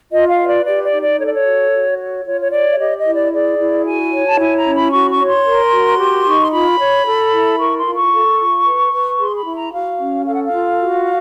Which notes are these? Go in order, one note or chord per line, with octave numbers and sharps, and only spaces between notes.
F4 D#5
F5
B4
D5
G4 D5
D5
D#4
D5
A4 C#5
D5
C#5
F#4
F#4
C#5
F4 C#5
C#5
C#5 D5
E5
G4 D#5
D#5
E4
D5
G#4 D5
E4
F#4 G#5
C#5
A5
E4 G#5
A#5
C#4
B5
F#4 C#6
C#6
C#5
C6
A#4
F#4
G4
D#4 C#6
C6
F4 B5
C#5
A4
E4
A#4 C#6
C6
F4
C#6
A4
F4
B4
B4
G#4 C6
B5
E4
A#5
F#4 F5
C#4
A4 F5
F#5
F5
F4
F#4